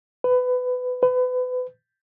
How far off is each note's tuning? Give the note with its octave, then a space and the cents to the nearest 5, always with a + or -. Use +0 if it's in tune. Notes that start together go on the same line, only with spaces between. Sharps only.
B4 +20
B4 +30